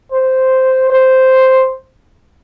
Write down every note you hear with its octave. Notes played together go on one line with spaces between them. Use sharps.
C5
C5